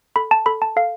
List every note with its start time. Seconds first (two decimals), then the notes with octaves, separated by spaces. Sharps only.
0.16 A4 B5
0.31 A5
0.46 A4 B5
0.62 A5
0.76 A4 F5